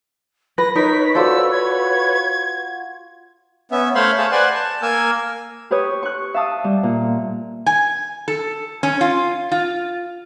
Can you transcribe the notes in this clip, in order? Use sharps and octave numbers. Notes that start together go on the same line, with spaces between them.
B4 A#6
D#4 A#4 B4 C#5 B6
F4 F#4 A4 C5 D5 E6
G#6
B3 C#4 E5
A3 C5 C#5 F5 B5 C6
G#4 C5 F5 A5
B4 C5 D5 F#5 G#5 C6
A5
A#3 A#4 G#5 E6
G4 B4 C#5 D#6
C#6 F#6
E5 F5 A5 D#6 E6
G3
A#2
G#5
A4
C#4
F4
F4